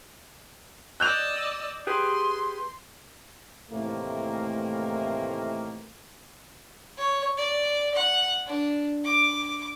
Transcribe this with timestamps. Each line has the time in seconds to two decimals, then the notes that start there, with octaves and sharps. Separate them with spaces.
1.00 D5 D#5 E6 F#6 G6 F7
1.87 G4 G#4 B4 C6
3.71 A2 C3 D#3 E3 A3 A#3
6.98 C#5
7.37 D5
7.94 F#5
8.47 D4
9.04 D6